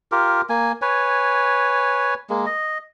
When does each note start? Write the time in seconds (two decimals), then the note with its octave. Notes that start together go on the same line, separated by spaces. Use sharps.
0.12 F4 G4 A#4
0.49 A#3 G#5
0.82 B4 C#5 G#5
2.30 G#3 A#3
2.46 D#5